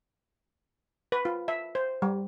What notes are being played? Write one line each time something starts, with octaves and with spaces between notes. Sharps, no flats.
B4
F4
E5
C5
G3